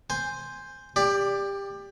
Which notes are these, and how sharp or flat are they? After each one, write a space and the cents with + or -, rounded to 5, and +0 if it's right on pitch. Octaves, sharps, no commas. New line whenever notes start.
C5 +0 G#5 -5
G4 +20 D5 +0